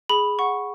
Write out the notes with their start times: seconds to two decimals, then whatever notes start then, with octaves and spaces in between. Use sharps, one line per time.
0.09 G#4 B5
0.39 F#5 C#6